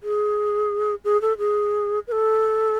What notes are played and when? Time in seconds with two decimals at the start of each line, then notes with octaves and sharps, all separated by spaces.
0.03 G#4
1.05 G#4
1.22 A4
1.38 G#4
2.07 B4
2.12 A4